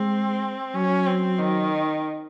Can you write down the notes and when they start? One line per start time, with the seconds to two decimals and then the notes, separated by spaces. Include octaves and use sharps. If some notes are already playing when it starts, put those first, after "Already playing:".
Already playing: G#3 C4
0.75 F#3 C#4
1.07 C4
1.39 D#3